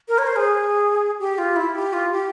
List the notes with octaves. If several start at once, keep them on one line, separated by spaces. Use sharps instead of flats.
A#4
C#5
C5
G#4
G4
F4
E4
G4
F4
G4